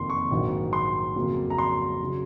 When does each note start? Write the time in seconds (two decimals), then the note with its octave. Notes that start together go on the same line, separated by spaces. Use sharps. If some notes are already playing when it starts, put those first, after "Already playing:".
Already playing: F#1 F2 C3 D#3 A#3 C6
0.10 C#6
0.31 A#1 G#2 D#3 F#3
0.73 C6
1.16 F2 C#3 F#3 A#3
1.50 A#5
1.58 C6
2.02 C#3 F#3